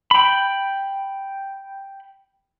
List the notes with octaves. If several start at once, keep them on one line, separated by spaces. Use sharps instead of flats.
G5 B5